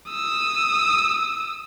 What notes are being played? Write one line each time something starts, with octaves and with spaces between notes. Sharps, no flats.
D#6 E6